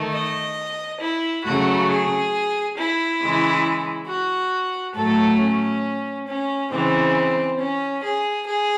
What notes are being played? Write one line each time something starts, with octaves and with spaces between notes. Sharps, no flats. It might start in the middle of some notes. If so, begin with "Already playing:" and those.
Already playing: D#3 A3
D#5
E4
C#3 F#3 A3 F#4
G#4
E4
C#3 E3 G#3
F#4
A2 F#3 A3 A4
C#4
C#4
C#3 E3 G#3 C4
C#4
G#4
G#4